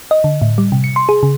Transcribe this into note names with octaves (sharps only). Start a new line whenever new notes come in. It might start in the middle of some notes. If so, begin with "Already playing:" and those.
D#5
D3
A2
G3
C3
C#7
C6
G#4
C#3